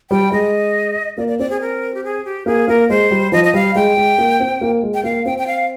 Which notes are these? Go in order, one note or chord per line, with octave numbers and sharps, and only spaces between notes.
G3 G5
G#3 D#5
A#3 D5
D5
C4 D5
G#4
A#4
G4
G#4
G4
A#3 G#4
A#3 A#4
G#3 C5
G3
F3 D#5
D#5
G3 F5
G#3 G5
G#3
A#3
C4
A#3
G#3
G5
A#3 F5
C4 G5
G5
F5